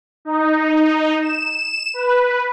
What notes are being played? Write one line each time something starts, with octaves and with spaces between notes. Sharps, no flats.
D#4
E7
B4